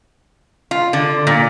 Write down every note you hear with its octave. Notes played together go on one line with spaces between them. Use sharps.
F4
D3
A#2